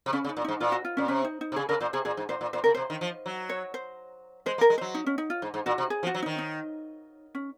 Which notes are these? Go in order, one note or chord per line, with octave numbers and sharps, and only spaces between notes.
C3
C#3 C#4
C#3
D#4
A#2
G#2 D#4
A#2 F4
F#4
F4
A#2 C#4
C3 C#4
D#4
D#4
C3
C#3 G#4
C#3 A#4
A#2 C5
C3 G#4
A#2 G#4
G#2
A#2 C5
A#2
A#2 C5
C#3 A#4
C3 C5
D#3
F3
F#3
C#5
C5
G#3 C5
A#3
A#4
G#3
F#3 C5
D#4
C#4
D#4
F4
G#2
G#2
A#2 F#4
C3
G#4
F3
F#4
F#3
D#3 D#4
D#4
C#4